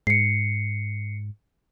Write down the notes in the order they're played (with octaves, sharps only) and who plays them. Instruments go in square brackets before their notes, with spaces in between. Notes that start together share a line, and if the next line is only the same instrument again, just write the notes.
[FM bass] G#2 [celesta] C7 C#7